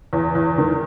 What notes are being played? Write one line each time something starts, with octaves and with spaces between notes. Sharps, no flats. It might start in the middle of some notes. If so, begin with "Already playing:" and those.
E2
E2
D#3